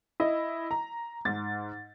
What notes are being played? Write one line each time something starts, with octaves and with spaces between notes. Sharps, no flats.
E4 D#5
A#5
G#2 A6